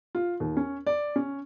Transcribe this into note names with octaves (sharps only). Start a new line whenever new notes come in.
F4
D#2
C#4
D5
C#4